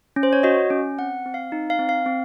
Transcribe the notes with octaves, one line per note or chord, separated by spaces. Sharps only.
C#4
C5
C#5
F#4 D#5
C#4
C4 F#5
C4
F5
D#4
F5
C4
F5
C4